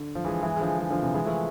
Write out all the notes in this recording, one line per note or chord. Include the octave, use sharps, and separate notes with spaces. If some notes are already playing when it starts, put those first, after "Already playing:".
Already playing: D3
F3
E3 G#3
E3 G#3
G#3
D3 F3
E3 G#3
D3 F3
C3 E3
E3 G#3
F3 A3